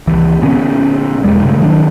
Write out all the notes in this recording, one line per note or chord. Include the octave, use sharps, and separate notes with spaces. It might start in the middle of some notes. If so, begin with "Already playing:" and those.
C#2 E3
A#2 D3 B3 C#4
E1 E2 G3 G#3
G2 A#2 C#3 A3
D#3 F#3 B3 D4